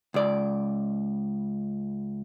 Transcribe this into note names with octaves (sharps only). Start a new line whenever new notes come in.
C#2 D5